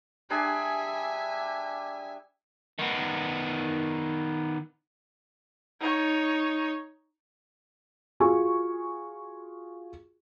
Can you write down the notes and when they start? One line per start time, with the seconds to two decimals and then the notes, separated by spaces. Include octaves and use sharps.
0.30 G3 D4 G#4 E5 G#5
2.79 D#3 B3
5.80 D#4 C#5
8.20 F4 F#4 G#4 G#5 C#6